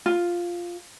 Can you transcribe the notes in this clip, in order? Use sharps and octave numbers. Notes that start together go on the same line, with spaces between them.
F4